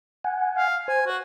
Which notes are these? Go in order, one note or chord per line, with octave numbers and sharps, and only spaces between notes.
F#5 G#5
F5
C5 G#5
F#4